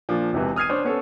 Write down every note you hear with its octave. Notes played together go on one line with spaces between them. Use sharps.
A#2 F3 A#3 D4
E1 C3 E3
D#6 F6 G#6 C7 D#7
D4 C5 C#5
B3 C#4 A4